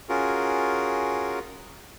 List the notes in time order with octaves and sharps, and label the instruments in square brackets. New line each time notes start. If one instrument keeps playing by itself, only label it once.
[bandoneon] C#4 F4 F#4 G#4 A#4